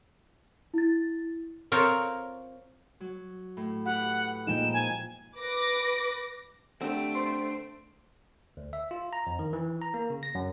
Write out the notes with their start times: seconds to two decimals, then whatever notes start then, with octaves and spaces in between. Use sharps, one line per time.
0.74 E4 A6
1.72 C4 F4 A#4 C5 C#5
3.00 F#3
3.57 A2
3.85 E4 G4 B4 F#5
4.47 A#2 F3 G#3 D#4 G5 E7
4.73 G#5
5.38 B4 D6 A#6
6.81 D3 A3 C4 G4 D7
7.15 C5
8.57 D2
8.73 E5
8.91 F4
9.13 A#5
9.27 F2
9.39 D#3
9.53 E3
9.82 A#5
9.94 A#3
10.10 C#3
10.23 A#6
10.35 F#2